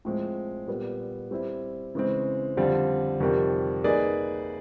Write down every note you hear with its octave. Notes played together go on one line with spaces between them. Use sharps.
A2 F3 G#3 C4
A#2 G3 B3
G3 C4 E4
C#3 E3 G#3 C4
F2 D3 G3 C4 F4
F2 C3 D#3 G3
A#3 D#4 G#4 B4 D5